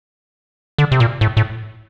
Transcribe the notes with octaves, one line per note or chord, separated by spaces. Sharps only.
D3
C3
A#2
A2
A2